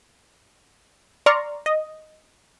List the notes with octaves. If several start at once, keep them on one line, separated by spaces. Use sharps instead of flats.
D5 A#5 C6 C#6 F6
D#5